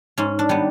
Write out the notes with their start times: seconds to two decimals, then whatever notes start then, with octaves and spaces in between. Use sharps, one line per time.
0.18 G#2 C#4
0.39 D4
0.49 D#3 G3 B3